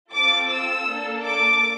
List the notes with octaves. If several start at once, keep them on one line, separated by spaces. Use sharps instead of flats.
C4 F4 A4 D6
E6
A#3 D4 A4
D6